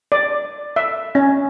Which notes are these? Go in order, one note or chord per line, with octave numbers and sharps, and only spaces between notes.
D5
E5
C#4